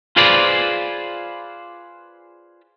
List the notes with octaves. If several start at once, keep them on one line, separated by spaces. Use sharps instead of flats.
F4 G#4 B4 C5 D5